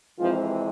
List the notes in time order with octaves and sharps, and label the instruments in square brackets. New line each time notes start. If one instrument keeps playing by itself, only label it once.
[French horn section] F2 C3 E3 F3 G#3 C4 F4